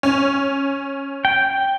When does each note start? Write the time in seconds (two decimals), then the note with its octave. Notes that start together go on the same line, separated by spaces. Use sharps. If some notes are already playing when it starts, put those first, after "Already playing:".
0.03 C#4
1.25 G5